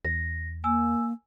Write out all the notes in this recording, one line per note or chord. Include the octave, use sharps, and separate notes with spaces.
E2 A#6
A#3 G#5 E6